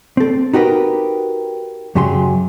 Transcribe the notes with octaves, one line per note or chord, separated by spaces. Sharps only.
C4 A4
D#4 F#4 G4 A#4 B4
F#2 C#3 F#3 G4 G#4 C6